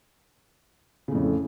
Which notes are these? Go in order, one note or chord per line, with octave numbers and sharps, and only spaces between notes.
F2 A2 C#3